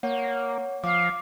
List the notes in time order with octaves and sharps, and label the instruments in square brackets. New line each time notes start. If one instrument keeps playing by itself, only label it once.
[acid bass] A#3 [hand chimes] C#5 F#5
[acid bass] F3 [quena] F5 [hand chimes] D6